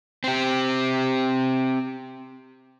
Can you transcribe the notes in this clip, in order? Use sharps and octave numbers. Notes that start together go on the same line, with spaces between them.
C4 G4